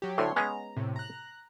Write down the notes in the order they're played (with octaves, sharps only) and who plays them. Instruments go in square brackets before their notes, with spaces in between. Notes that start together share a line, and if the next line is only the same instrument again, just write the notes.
[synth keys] F#3 G4
[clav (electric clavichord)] D2 A2 A3 [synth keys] C#5 C6
[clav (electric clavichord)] G#3 B3 C#4 [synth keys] A#5
[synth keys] A2 C3
A#5 F#6